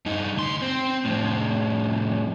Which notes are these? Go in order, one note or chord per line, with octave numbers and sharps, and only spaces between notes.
G2 D#4
D2 C6
C4
F2 A2